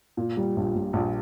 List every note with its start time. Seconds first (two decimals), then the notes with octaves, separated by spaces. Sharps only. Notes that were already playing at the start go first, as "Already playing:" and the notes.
0.17 A#2
0.37 G3
0.57 A#1
0.75 A#1
0.93 A#1